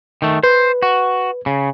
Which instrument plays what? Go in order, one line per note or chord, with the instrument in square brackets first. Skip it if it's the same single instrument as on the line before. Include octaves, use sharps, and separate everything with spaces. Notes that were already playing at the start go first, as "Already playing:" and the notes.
[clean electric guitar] D#3 A3
[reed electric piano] B4 [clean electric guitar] C5
[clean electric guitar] F#4
C#3